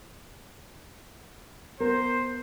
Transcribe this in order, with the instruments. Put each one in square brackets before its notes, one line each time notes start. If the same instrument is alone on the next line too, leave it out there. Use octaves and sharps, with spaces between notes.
[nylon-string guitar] B3 A#4 [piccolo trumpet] C5